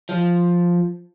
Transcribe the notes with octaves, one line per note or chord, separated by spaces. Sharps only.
F3